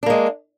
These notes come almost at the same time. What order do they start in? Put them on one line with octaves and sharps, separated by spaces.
D4 A#3 G#3